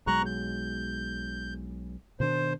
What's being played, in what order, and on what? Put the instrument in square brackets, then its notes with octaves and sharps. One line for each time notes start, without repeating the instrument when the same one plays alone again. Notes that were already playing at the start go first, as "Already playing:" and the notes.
[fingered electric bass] B1 F#3 G#3 [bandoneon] A#5 C#6 F#6
[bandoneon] G6
[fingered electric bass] B2 D#3 D4 [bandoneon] C5